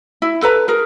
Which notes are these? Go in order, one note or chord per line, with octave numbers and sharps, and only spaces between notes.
E4
A4 B4 A#5
G#4 A#4